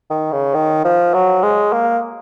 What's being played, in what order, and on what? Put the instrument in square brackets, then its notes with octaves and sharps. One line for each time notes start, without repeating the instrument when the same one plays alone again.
[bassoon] D#3
C#3
D#3
F3
F#3
G#3
A#3